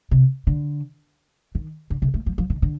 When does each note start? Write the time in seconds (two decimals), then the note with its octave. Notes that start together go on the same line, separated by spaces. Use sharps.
0.11 C3
0.47 D3
1.55 D#3
1.90 D3
2.02 C3
2.14 A3
2.26 F3
2.38 F3
2.50 D#3
2.62 D3